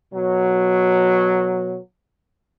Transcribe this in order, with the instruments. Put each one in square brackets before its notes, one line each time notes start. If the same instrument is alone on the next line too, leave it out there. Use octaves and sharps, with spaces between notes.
[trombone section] B2 F#3